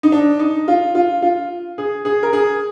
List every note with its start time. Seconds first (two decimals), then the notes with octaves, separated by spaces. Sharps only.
0.03 D#4
0.12 D4
0.39 D#4
0.68 F4
0.95 F4
1.22 F4
1.78 G#4
2.05 G#4
2.23 A#4
2.33 G#4